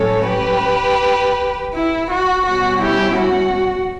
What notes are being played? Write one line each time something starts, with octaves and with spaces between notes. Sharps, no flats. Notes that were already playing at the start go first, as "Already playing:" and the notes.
Already playing: A2 F#3 C#4 A4 C#5
G4 B4
E4
F#4
B2 G3 C#4 F#4
E4 G4
F#4